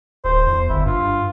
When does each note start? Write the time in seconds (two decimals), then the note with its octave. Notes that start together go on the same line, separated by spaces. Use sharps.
0.24 D1 C5
0.47 E2
0.69 G1 E4
0.86 G2 F4